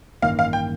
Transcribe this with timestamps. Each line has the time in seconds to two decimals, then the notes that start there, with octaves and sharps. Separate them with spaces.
0.22 A1 G2 D#3 A#3 F5
0.39 F5
0.53 G5